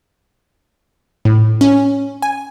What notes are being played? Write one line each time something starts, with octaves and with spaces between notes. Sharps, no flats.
A2
C#4
G#5